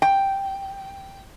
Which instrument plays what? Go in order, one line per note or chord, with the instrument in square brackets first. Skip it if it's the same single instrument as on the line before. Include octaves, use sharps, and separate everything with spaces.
[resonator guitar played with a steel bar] G5